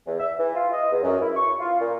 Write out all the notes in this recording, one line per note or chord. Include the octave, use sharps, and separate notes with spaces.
E2
E5
E3
F4
D#5
E2
F#2
E4
C#6
F4
A#2